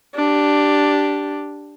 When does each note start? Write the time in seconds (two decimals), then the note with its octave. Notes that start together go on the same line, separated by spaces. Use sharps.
0.15 D4 G4